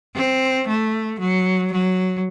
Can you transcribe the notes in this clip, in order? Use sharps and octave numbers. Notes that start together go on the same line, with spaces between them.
C4
A3
F#3
F#3